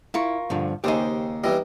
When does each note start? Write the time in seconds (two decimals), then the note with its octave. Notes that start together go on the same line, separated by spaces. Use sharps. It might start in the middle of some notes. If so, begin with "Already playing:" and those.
0.14 E4 F4 A#4 C#6
0.50 G2 D3 F3
0.84 D#2 C#3 D#4 G4 C5 G#5 D#6
1.44 E2 E3 G3 D#5